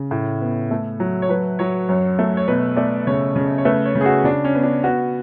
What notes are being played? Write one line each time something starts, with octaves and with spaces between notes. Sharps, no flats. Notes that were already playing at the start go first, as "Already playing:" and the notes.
Already playing: C#3
A2
B3
A3
F#3
C#5
F#3 B4
F#3 C#5
F#2 C#5
A3
C#5
B2 B4
A3 D5
C#3 C#5
C#3
C#5
A3 B4
C#5
C#3
G#4
F#4
C#3 D4
C#4
B3
D4
B3 F#4